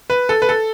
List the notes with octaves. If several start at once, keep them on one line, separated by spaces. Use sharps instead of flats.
B4
A4
B4
A4